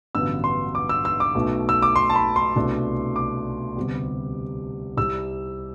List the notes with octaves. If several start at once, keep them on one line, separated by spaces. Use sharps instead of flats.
A1 G2 D3 F#3 B3 E6
C6
D6
E6
E6
D6
B1 B2 A3
E6
D6
C6
A5
B5
C6
C2 B2 A3 D4
D6
D2 C3 G3 B3
C2 C3 G3 E6